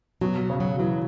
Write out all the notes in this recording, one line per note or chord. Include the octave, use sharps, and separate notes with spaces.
B2 F#3
F#3
C#3
F#3
E3 F#3